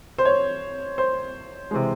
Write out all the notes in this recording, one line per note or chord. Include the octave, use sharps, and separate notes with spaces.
C5
C#5
C5
C3 E3 G#3